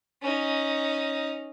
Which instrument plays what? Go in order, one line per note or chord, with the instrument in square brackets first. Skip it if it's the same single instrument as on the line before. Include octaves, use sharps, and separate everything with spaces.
[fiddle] C#4 D#4